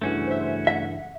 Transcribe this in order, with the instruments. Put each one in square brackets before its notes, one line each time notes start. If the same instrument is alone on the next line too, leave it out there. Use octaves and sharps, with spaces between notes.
[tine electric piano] G2 C#3 E3 [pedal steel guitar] A3 C#4 F#4
[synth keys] C5 E5
[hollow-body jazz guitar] E5 [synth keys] F#5